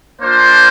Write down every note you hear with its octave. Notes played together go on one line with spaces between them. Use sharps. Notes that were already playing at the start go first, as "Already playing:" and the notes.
A#3 D4 F4 C5